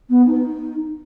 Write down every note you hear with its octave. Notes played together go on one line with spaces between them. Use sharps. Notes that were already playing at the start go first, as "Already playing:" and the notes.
B3
D#4